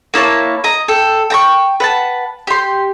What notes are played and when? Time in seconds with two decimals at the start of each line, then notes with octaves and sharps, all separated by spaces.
0.14 A#3 E4 C#5 A5
0.64 D#5 A#5
0.88 A4 G5
1.30 G5 A#5 C#6
1.80 B4 F#5 A5
2.47 G4 C6